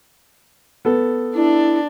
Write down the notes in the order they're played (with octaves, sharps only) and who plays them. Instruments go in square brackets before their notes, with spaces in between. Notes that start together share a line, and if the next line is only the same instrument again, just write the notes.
[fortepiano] B3 A4
[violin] D4 [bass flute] E4